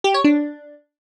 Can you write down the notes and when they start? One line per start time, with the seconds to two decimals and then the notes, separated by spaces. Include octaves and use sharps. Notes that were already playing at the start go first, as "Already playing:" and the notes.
0.04 G4
0.14 C#5
0.24 D4